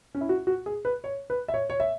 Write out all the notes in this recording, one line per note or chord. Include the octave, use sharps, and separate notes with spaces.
C#4
E4
F#4
F#4
G#4
B4
C#5
B4
E5
C#5
C#5
E5